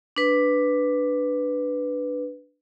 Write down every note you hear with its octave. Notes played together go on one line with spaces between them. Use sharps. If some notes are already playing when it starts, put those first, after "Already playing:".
D4 B4